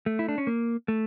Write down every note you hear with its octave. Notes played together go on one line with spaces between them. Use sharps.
A3
E4
D4
C#4
A#3
A3